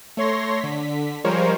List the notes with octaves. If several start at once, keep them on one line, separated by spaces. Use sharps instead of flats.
A3 C#5 C6 A#6
D3 B6
F3 G3 G#3 A#4 C5 C#5